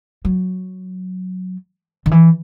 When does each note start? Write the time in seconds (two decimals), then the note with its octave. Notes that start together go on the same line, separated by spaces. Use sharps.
0.25 F#3
2.06 D#3
2.11 E3